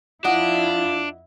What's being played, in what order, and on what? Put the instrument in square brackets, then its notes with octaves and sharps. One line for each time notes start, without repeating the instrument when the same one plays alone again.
[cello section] F2 E4 [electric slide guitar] D4 [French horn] F4 [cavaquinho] D#5 F#5